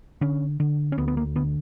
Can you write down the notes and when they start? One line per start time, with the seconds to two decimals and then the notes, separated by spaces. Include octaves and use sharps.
0.21 D3 C#4
0.60 D3
0.92 C#4
0.98 D2 B3
1.08 B3
1.17 A#3
1.36 D3 B3